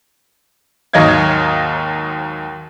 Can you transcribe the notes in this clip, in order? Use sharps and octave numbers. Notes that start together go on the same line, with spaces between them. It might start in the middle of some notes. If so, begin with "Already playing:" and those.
D#2 G#2 F#3 D#5 F5 G#6